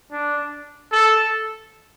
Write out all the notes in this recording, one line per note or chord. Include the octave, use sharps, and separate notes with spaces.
D4
A4